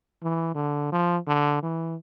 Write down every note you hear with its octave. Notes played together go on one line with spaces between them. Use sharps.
E3
D3
F3
D3
E3